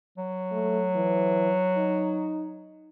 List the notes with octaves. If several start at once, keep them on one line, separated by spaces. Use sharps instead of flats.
F#3
A3
E3
D#4